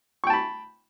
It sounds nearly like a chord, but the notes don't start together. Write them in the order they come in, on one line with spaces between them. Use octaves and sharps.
C#6 G5 A5 B5